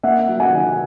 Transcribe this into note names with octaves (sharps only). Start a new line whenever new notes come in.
A#3 E5 F#5
F#3
F#5 G#5
D#3